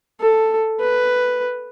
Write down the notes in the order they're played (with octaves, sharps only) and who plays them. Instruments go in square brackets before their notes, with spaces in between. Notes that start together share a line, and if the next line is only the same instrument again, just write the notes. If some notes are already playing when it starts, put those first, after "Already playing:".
[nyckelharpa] A4
B4